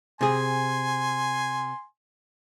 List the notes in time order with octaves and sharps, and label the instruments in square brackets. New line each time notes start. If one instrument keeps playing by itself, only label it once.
[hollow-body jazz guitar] C3 G#4 [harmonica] G#5 C6